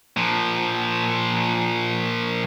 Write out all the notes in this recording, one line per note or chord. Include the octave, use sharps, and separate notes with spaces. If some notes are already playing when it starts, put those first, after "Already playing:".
A#2 F3